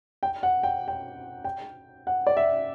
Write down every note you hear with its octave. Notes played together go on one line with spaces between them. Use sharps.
G5
F#5
G5
G5
G5
F#5
D5
E5